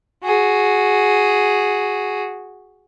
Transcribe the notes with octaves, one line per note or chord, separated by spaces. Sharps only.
F#4 G#4